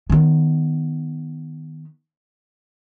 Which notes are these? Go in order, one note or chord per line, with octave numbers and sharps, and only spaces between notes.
D#3 B3